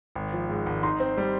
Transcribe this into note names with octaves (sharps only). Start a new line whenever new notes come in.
G#1
F3
G#2
G#1
D#4 C6
C4
G3